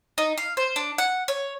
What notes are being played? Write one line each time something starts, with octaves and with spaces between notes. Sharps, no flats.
D#4
F5
C5
D4
F#5
C#5